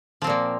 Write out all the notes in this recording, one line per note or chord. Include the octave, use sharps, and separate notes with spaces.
A#2 F3 A#3 C4